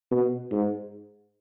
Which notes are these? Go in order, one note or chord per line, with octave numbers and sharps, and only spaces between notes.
B2
G#2